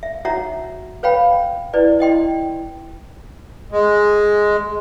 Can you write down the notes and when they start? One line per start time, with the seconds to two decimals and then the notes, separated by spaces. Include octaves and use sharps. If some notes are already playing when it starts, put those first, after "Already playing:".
0.03 E5
0.25 D#4 F#4 C#5 E5 F#5 A#5
1.03 B4 C#5 F5 G5 B5
1.73 E4 B4 D5
1.99 E4 D#5 G5 C6
3.72 G#3